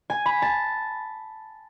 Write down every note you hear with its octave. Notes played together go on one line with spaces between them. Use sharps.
G#5
B5
A5